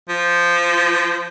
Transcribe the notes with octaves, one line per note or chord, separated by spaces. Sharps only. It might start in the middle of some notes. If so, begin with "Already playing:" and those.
F3